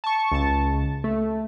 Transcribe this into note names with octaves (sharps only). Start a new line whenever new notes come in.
A5 C#6
C#2 A5
A3